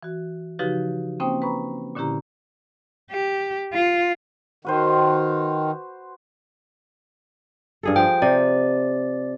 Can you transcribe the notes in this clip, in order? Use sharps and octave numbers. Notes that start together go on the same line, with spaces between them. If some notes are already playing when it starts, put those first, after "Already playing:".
E3 F#4
C#3 F3 D#4 F#4 G4 B4
A#3 C4 C#4 C5 G5 D#6
B4 A#5 B5 C#6
A#2 D3 C#4 E4 G4 A#5
G4
F4
D#3 F#4 B4 C5
G2 G#4 A4
F3 G5
C3 D5